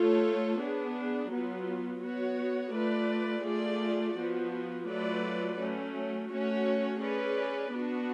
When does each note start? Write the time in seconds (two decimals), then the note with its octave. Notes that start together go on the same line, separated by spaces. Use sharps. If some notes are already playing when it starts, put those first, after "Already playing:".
Already playing: A3 F4 A4 C#5
0.60 B3 D4 G#4
1.32 F#3 B3 F4
2.03 B3 F#4 C#5
2.74 A3 F4 B4 D5
3.45 A3 F4 G#4 D5
4.16 F3 B3 F#4
4.88 F#3 A3 F4 B4 D5
5.59 F#3 A3 C#4
6.30 A3 C#4 F#4 C#5
7.01 C#4 G#4 B4 D5
7.72 B3 D4 F#4